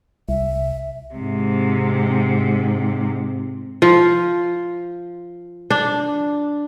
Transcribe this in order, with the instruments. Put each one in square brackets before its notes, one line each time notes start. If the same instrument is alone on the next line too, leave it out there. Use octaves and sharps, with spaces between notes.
[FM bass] C2 [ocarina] E5
[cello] G#2 C3
[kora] F3
D4